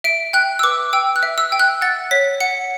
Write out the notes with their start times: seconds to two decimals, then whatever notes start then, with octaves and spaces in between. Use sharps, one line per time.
0.04 E5 D7
0.33 G5 F#6
0.59 E6
0.63 B4 D6
0.93 G5 E6
1.16 F#6
1.23 E5
1.38 E6
1.52 G5
1.59 F#6
1.82 F#5 A6
2.11 C#5 B6
2.40 F#5 C#7